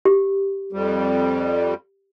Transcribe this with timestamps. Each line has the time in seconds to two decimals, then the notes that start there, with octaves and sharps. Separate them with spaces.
0.05 G4
0.72 F2 G3